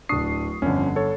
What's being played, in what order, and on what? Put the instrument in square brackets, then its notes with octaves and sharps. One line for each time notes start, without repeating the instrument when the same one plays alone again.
[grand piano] D1 D4 [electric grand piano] C#6 D#6 C7
[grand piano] G1 D3 [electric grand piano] F2 C#4
[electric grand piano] A4 C#5